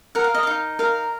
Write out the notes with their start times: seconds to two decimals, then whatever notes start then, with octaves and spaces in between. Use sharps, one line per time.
0.15 A#4 F#5
0.24 F5
0.34 D#5
0.43 D#4 F5
0.79 A#4 F5